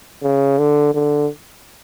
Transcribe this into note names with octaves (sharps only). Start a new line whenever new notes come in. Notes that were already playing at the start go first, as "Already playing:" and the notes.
C#3
D3
D3